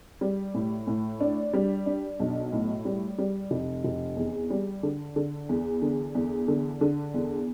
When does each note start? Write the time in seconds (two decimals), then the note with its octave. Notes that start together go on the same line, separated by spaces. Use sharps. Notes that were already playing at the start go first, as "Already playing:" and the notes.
0.21 G3
0.54 A2
0.87 A2
1.20 D4
1.54 G3
1.86 D4
2.20 B1
2.52 A2
2.85 G3
3.18 G3
3.51 F1
3.84 F1
4.17 E2
4.50 G3
4.83 D3
5.16 D3
5.49 E2
5.82 D3
6.15 E2
6.48 D3
6.81 D3
7.14 E2